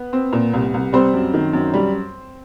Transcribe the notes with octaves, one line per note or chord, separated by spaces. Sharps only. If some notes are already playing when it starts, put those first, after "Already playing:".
Already playing: B3
C4
A#2
C2
C2
G3 C4 C5
F#2
D#3
F#2
G3